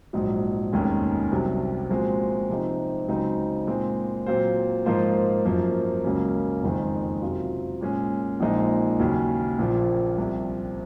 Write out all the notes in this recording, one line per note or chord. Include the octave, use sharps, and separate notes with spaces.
A#1 G#2 F#3
F1 D#2 D#3 G#3 C#4
C2 C3 F#3
A#2 F3 G#3 C4 F#4
C3 F3 C4 D#4
C#2 C#3 F#3 C4 D#4
A#2 G#3 C4
A#2 F#3 C4 F4 C5
G#2 F3 A#3 F4 C5
F#2 F3 A#3
C#2 C#3 F#3 A#3 C#4
F#1 F2 D#3 G#3 C4
C3 F#3 C4 F4
A#2 G#3 C#4
A#1 A#2 F3 G#3 D#4
D#2 C#3 F#3 C#4
A#1 A#2 F3
C2 C3 F3